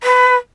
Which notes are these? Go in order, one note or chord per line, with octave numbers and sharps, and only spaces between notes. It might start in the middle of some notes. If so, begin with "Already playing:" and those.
B4